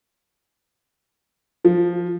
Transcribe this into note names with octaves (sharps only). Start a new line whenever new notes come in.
F3